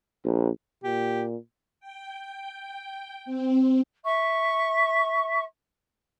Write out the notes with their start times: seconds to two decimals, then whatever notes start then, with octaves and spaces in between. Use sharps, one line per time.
0.24 A#1
0.84 A#2 G4
1.80 G5
3.25 C4
4.04 E5 C#6